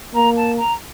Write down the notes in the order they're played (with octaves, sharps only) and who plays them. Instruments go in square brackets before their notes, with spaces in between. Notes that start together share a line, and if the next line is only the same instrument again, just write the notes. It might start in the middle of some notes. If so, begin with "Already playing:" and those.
[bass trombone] A#3 [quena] A#5
[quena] A5
A#5